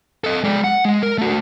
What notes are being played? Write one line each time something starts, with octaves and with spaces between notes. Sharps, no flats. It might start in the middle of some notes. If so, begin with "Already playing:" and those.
A4 D#5
G#3 D5
F#5
G#3
A#4
A3 F#4